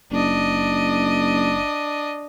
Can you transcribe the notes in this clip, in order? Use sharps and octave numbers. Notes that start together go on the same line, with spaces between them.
F#1 D4 D#5